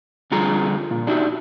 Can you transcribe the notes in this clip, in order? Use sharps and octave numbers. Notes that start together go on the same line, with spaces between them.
F2 D3 G3 F4 G#4 A#5
A#2
D4 D#4 F#4 G4 E5